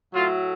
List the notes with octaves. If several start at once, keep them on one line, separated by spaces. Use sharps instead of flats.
A2 F#3 A3 F4